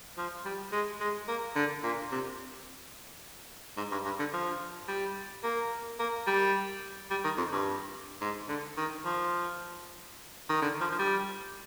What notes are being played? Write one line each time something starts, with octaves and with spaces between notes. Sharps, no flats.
F3
G3
G#3
G#3
A#3
D3
A#2
C3
G#2
G2
G2
D3
F3
G3
A#3
A#3
G3
G3
D#3
F2
G2
G#2
D3
D#3
F3
D#3
D3
F3
F3
G3